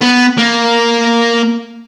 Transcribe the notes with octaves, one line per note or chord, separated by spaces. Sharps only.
B3
A#3